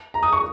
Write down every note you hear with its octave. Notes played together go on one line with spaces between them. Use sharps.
A#5
D#6
C#6